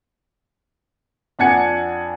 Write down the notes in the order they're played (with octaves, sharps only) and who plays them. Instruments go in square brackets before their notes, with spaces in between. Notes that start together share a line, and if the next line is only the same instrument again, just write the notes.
[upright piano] F2 D4 F#5 G#5 G#6 C#7